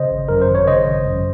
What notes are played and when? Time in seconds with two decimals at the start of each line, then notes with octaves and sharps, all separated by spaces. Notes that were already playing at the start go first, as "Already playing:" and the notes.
Already playing: C#3 C5 D#5
0.11 G#1
0.28 F#2 A#4
0.42 C5
0.49 G#1
0.55 C#5
0.67 C#3 C5 D#5
0.87 G#1
1.06 F#2